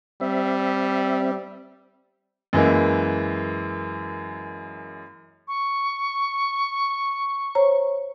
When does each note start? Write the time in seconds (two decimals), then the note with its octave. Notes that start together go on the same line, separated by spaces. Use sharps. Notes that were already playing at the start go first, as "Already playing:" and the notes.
0.21 G3 C4 E5
2.53 F#2 E3 G#3 A#3
5.48 C#6
7.55 C5 C#5 A#5